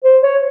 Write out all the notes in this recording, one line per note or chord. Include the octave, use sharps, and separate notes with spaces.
C5
C#5